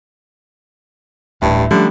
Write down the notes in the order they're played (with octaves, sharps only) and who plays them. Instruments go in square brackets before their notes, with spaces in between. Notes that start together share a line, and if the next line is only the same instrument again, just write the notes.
[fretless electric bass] D1 [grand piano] A1 [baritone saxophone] G2 [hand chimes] E5
[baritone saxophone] D3 [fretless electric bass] F3 [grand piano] G3 [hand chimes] A3 C#4 G4